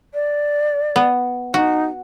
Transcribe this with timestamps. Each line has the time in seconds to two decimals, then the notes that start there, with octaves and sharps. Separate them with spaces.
0.14 D5
0.96 B3
1.54 D#4 F#4